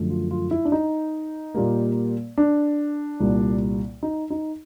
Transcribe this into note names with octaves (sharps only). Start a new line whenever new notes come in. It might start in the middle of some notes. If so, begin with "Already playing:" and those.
Already playing: F#2 D3 F3 A3
F4
F4
E4
D4
D#4
A#2 G3 A#3
D4
C2 A#2 G3
D#4
D#4